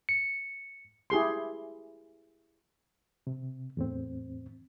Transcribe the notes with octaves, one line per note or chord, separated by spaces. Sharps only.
C#7
E4 G4 G#4 C6
C3
E2 A2 C4